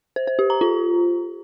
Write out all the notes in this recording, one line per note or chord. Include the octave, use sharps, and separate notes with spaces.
C5
C5
G4
A#5
F4